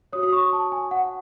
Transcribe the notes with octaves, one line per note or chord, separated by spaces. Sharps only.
F#4 C#5 D#6
D#6
C#6
A5
G#5
F#5